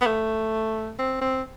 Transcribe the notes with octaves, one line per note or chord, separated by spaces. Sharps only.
B3
A3
C4
C4